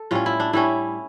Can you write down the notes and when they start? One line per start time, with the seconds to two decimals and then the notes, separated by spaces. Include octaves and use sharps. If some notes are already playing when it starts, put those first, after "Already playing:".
Already playing: A4
0.11 A2 G3 C#4 F4
0.26 E4
0.40 D4
0.53 A2 G3 C#4 E4